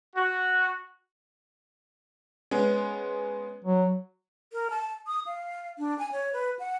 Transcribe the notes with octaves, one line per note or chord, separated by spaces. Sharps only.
F#4
G#3 B3 C#4
F#3
A#4
A5
D#6
F5
D4
G#5
C#5
B4
F#5